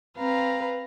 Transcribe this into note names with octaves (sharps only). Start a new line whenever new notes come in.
C4 B4 F5 A#5